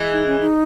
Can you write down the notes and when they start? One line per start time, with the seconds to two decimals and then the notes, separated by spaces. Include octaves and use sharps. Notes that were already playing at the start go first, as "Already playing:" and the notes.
Already playing: E3 G#3
0.12 D#4
0.26 C#4
0.40 D#4